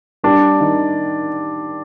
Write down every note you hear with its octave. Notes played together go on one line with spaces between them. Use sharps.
G3 D4
D#3